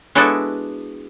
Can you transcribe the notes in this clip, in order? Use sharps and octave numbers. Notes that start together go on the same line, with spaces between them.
G#3 B3 D4 E4 F#4 A4